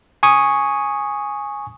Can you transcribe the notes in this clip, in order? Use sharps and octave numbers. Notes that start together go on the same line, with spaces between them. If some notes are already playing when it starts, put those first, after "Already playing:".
G#5 C#6 D#6